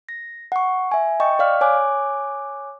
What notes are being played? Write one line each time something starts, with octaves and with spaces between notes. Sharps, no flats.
A#6
F#5 C#6
E5 G#5
D#5 G5 C#6
D5 F5 F6
C#5 G#5 D6 F#6